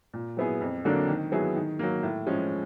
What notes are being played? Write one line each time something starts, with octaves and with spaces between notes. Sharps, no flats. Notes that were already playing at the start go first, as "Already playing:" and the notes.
A#2
F#3 B3 E4 G#4
F2
D3 F#3 A#3 D4
D#3
F#3 B3 E4 G#4
D#3
F#3 A#3
A2
F3 G#3 C#4